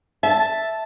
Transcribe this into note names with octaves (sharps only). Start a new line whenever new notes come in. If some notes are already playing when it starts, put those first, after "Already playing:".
E5 A5